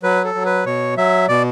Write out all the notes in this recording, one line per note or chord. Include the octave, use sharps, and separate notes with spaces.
F#3 B4
A4
F#3
B4
B2 C#5
F#3 E5
B2 D5